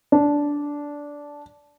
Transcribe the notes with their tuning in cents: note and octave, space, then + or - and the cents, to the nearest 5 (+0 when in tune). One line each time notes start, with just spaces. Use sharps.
D4 -10